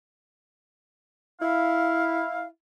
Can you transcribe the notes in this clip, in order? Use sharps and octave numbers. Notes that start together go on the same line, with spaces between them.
E4 F5